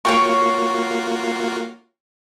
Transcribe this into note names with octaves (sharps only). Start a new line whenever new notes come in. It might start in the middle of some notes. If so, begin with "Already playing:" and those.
A#3 F4 F#4 C#5 G5 C#6